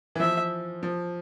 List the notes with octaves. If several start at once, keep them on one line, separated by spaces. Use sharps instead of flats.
E3
F3 E5
F3